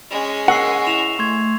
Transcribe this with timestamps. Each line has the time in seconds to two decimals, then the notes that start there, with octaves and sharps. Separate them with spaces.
0.11 G#3 C#4
0.48 A#4 F#5 C#6 E6 C7
0.87 E4 E7 F7
1.19 A3 C6 C#6 G#6